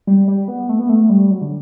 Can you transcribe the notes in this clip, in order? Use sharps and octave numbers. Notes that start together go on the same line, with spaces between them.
G3
G3
B3
A3
B3
A3
G3
F#3
D3